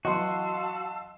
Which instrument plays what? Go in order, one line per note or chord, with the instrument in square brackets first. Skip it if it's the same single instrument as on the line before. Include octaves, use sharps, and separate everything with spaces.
[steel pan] E3 F#3 [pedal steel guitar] F#4 [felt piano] D#5 C6 [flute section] F5 A5 E6